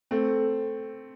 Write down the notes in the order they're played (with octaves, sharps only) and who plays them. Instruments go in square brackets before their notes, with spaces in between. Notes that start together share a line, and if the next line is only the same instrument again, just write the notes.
[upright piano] A3 C4